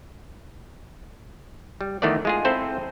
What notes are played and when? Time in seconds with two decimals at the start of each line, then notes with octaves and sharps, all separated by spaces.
1.81 G3
2.02 D#3 E3 A3 B3 D5
2.25 G#3 F4 G#4
2.45 C4 E4 A4 C5